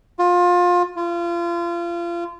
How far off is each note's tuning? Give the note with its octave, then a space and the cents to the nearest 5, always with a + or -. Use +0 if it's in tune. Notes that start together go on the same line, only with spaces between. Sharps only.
F4 +25
F4 -30